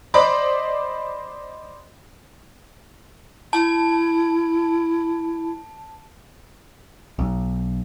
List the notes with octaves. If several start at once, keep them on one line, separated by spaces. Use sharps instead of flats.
C5 D5 D#5 B5 D6
E4 A5
B1